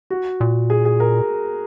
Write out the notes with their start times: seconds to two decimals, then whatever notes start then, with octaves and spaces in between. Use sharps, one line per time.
0.10 F#4
0.41 A#2
0.70 G#4
0.85 G#4
1.00 A#4